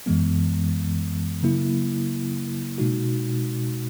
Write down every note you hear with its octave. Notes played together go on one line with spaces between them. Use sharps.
F#2 E3 G#3 B3
C#3 F#3 A#3 E4
B2 G#3 D#4 F#4